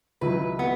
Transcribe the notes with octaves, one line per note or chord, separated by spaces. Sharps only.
C#2 C#3 F#3 E4 B4
B3